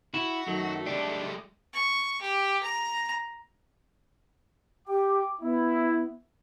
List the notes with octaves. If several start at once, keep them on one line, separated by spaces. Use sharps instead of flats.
E4 F#4
F#2 D#3 F#3 A3
G#3 D4 G4 D5
C#6
G4
A#5
G4 G5 D6
B3 E4